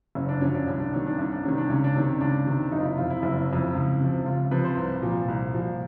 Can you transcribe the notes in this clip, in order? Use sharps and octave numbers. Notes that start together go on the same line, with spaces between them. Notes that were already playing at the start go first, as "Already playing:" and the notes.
F#1 C#4
D4
F#2 D3 F3 C#4
D4
C2 C#4
D4
C3 D#3 C#4
D4
C2 C#4
D4
C3 D#3 C#4
D4
C#2 C#4
D4
C3 D#3 C#4
C#2 D4
C3 D#3
F#1 D#4
F4
E4
F2 C3 F4
E4
F#1
F2 C3
C#2
C3 F3
C#2 F4
C3 F3 B4
C5
C2
A#2 F3
C2
A#2 F3